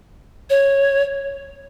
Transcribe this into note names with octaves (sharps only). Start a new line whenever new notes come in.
C#5